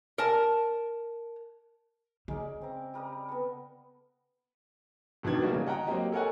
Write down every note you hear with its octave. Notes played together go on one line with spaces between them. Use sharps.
A#4 A5
C#3 G#3 A#4 D5
C4 A#5
G3 A#4 D#6
B3 A4
E1 B2 D#3 D4 G#6
E3 G3 G#3 A#3 B3 F#4
C#3
D#5 F#5 G5 A#5
F#3 A#3 C4 G4 D#5
A4 A#4 C#5 F#5 G#5